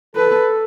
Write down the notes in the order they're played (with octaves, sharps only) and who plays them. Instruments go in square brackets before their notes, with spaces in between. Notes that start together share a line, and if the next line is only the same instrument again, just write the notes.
[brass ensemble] A4 [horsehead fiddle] B4